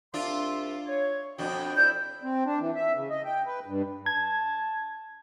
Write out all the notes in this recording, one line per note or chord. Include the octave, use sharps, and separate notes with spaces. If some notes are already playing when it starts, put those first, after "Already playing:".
C2 D4 F4 E5 C6
C#5
F2 B2 D4 F#4 G5
F2 E4 D5 G6
C4
D4
E3
E5
C#3
D#5
G5
B4
G2
A5 G#6